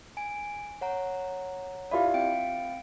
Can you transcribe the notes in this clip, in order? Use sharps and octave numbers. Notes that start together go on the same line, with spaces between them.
G#5 D7
C#5 F#5 A#5
E4 F4 G4 D5 E5 B5
C4 G5 D7